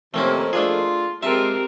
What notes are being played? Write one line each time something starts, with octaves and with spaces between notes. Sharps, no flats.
F2 C3 D#3 A3 A#3 C4 C#4
A3 D4 F4 G#4
G#3 C4 F4 G4 A#4 E5 A5